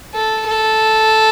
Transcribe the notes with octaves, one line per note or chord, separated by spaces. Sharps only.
A4
A4